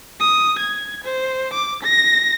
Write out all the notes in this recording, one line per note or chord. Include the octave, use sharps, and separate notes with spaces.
D#6
G#6
C5
D6
A#6